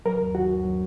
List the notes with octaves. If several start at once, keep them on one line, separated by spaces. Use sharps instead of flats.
F#3 A#4
D#2
D#3 F#4
D#2
F#3